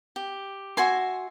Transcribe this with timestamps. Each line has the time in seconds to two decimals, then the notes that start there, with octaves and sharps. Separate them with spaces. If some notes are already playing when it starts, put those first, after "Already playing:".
0.16 G4
0.77 F#4 E5 G#5 C6